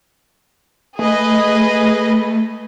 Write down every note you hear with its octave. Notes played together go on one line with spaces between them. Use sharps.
A3 G#4 B4 D#5